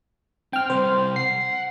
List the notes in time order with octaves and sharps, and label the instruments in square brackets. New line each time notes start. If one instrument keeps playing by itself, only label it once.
[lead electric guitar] C4 [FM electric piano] G5 F6
[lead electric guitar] C3 G3 [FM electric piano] C5
[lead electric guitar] F#5 [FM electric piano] C7